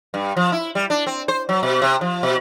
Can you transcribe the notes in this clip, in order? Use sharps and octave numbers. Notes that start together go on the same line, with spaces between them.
G2
F3
E4
G3
D4
C4
C5
F#3
B2
C3
F3
B2